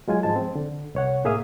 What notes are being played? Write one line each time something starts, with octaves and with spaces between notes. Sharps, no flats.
F#3 G#3 F4 G#5
G#2 F3 G#3 A5
C4
D3
C2 C#5 F#5
A2 A#3 G#4 E5 F5 D#6